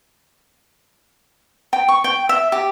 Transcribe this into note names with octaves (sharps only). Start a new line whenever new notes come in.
G5
C#6
G5
E5
G4